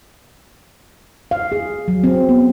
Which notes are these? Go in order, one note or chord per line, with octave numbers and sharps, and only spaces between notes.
F5
G#4
F#3
C4
B3